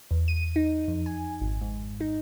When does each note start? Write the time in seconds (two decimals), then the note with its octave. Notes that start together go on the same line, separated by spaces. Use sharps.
0.11 E2
0.28 D#7
0.56 D#4
0.88 F2
1.06 G#5
1.41 G#1
1.61 G#2
2.01 D#4